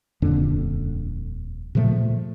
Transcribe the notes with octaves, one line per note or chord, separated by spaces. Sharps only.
D#1 F2 D3 D4
A#2 C#3 F3 A3